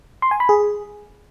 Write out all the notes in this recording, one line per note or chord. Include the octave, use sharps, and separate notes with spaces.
C6
G#5
B5
G#4